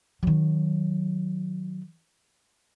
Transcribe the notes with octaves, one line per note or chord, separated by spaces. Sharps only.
D#3 F#3